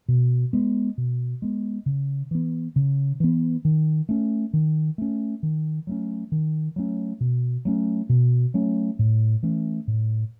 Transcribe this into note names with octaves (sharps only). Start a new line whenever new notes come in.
B2
G#3 B3
B2
G#3 B3
C#3
E3 B3
C#3
E3 B3
D#3
A3 C#4
D#3
A3 C#4
D#3
F#3 A3 C#4
D#3
F#3 A3 C#4
B2
F#3 A3 C#4
B2
F#3 A3 C#4
A2
E3 A3 C#4
A2